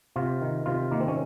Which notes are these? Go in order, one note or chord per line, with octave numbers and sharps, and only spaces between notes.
C3 F4
D#3
C3 F4
D#3 A#3
C4
C#4